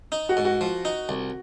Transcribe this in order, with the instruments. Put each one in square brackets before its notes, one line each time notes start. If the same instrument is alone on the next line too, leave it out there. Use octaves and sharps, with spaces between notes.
[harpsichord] D#4
[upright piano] F#4
[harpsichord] G#2
[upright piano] F#4
[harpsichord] F3
D#4
C2